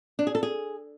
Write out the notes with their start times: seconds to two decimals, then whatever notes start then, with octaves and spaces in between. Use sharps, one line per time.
0.19 D4
0.27 G#4
0.35 A4
0.43 G#4